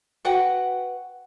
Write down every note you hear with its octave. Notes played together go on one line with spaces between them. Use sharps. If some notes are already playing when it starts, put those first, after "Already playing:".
F#4 B4 F#5 G5